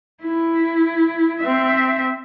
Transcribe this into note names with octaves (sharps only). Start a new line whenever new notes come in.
E4
C4 E5